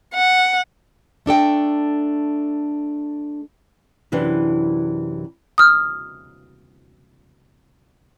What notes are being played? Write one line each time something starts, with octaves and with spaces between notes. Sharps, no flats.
F#5
A3 D4 A4 G5
F#2 C3 E3 D4 B4
D#6 F6